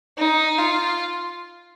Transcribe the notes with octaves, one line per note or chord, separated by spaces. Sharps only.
D#4
F4